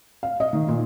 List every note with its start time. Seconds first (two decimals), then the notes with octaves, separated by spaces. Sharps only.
0.23 F5
0.40 D#5
0.53 D#3
0.68 A#2